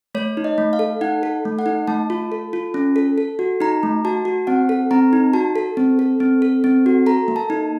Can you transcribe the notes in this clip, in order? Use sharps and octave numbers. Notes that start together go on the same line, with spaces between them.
A3 C#5
D#4
D#5
A3
F5
A4
D#4 F#5
A4
A3
F#5
D#4
A3 A5
F4
A4
F4
C#4
A4
A4
F#4
D#4 A#5
A3
F#4 A5
F#4
C4 F#5
A4
C4 A#5
D#4
F#4 A5
A4
C4
A4
C4
A4
C4
F#4
A4 A#5
A#3
A5
D#4